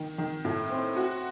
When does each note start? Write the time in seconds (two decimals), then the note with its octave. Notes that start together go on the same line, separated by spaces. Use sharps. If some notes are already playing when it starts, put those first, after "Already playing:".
Already playing: D#3
0.18 D#3
0.45 A2
0.70 C4
0.97 F#4